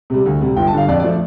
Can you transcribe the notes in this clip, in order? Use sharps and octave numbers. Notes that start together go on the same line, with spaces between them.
C3 G3
D2
C3 G3
G1 G5
A5
G2 D3 F5
F2 D5
D5
F3 A3